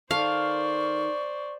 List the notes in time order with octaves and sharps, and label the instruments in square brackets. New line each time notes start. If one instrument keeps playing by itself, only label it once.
[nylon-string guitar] D#3 A4 [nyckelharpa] C5 D5 [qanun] F5 [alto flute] C#6